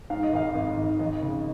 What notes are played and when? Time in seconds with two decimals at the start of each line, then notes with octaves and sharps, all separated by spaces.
0.10 G#2 F5
0.23 D#5
0.33 G#1 F5
0.54 G#1
0.77 G#1
0.99 D#2 D#5
1.22 C#3